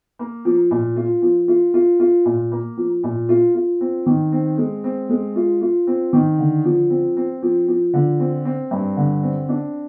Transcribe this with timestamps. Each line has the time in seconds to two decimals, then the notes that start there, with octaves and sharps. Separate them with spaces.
0.19 A#3
0.45 F3
0.71 A#2
0.96 F4
1.22 F3
1.48 F4
1.74 F4
2.00 F4
2.25 A#2
2.52 A#3
2.77 F3
3.04 A#2
3.29 F4
3.55 F4
3.81 C4
4.06 D#3
4.32 C4
4.58 G#3
4.84 C4
5.09 G#3
5.36 F4
5.61 F4
5.87 C4
6.13 D#3
6.39 D3
6.65 F3
6.90 C4
7.17 C4
7.43 F3
7.68 F3
7.94 D3
8.20 C4
8.45 C4
8.71 G2
8.97 D3
9.23 C4
9.49 D4